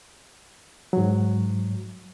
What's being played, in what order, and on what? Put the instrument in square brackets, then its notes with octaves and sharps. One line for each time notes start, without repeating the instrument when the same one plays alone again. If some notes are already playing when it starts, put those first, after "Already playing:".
[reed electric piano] G#2 F#3